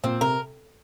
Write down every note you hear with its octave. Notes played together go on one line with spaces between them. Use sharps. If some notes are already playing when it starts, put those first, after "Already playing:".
A#2 C4
C3 A#4